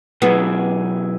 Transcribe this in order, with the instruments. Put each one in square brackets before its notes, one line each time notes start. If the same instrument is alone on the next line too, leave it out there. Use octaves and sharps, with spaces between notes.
[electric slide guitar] B2 F#3 E4 G#4 [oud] B3